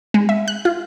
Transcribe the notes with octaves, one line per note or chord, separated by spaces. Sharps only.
G#3
E5
F#6
F4